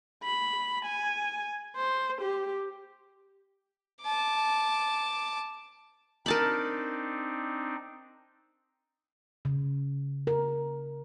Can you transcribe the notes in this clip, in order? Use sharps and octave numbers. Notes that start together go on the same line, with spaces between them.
B5
G#5
C5
G4
A5 D6
C4 D4 D#4 A#4 A5 B5
C#3
A#4